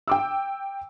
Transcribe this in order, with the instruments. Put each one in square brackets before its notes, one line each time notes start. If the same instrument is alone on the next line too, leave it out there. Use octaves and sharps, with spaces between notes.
[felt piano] G5 D6 E6